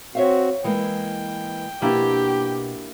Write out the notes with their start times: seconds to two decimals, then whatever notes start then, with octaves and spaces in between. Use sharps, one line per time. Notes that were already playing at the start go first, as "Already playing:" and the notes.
0.15 C4 F#4 C#5 E5 F5
0.64 E3 G#3 A#3 G5
1.82 B2 A#3 D4 E4 G4